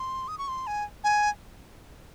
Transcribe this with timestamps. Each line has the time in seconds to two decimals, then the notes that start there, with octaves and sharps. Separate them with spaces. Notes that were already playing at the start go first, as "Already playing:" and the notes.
Already playing: C6
0.28 D#6
0.38 C#6
0.48 C6
0.67 G#5
1.04 G#5